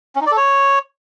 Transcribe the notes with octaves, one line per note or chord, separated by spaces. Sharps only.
C#4
D#4
D5
A4
C#5